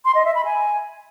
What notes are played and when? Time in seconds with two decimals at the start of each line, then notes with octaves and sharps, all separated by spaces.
0.05 C6
0.15 D#5
0.25 E5
0.35 B5
0.45 G#5